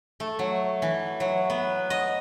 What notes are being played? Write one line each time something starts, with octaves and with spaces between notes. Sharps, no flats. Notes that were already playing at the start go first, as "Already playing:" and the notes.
A3
F#3
E3
F#3
B3
D#5